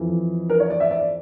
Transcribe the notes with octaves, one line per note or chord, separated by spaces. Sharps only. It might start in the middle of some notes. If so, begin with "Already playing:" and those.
Already playing: F2 E3
A#4
C#5
D5
E5
D5